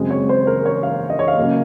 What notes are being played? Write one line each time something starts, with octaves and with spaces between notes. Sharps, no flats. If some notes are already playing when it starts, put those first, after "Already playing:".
Already playing: F#2 C#3 G#3 C4
C#5
C5
A#4
C#5
F5
D#5
C#5
F5
C#3 F#3 A#3